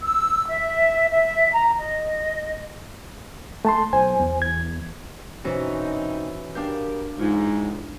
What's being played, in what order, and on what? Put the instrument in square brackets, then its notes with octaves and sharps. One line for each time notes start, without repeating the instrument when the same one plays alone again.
[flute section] E6
E5
E5
A#5
D#5
[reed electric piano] A3 A5 C6
[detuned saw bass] B1 [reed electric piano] C5 G#5
[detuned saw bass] E2
[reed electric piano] G#6
[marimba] F#2 B2 C5 [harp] E3 C#4 F#4 [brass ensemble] C4 D#4
[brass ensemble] B3 G4 A#4 [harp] D4 F5 G6
[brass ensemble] C#2 E3 [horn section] G#2 [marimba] F4